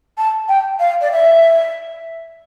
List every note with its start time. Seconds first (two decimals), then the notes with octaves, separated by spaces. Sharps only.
0.18 A5
0.49 G5
0.80 F5
1.01 D5
1.12 E5